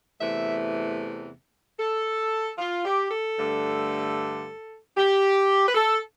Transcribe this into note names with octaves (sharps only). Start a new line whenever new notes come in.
E2 C3 E3 A3 E5
A4
F4
G4
A4
G2 D3 A3
G4
B4
A4